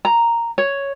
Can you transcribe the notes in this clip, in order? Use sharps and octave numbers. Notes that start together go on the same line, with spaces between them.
A#5
C#5